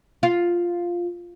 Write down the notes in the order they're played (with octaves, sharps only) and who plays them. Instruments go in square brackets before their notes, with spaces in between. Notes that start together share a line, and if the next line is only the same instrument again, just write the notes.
[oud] F4